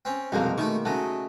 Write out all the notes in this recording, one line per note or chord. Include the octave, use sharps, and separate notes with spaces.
C4 C#4
C2 F2 B2 F#3 G#3 A#3
D#3 A3 E4 C#6
C#3 F#3 A3 D#5